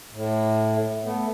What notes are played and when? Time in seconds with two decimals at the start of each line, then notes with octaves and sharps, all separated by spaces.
0.13 A2
1.04 A3 B3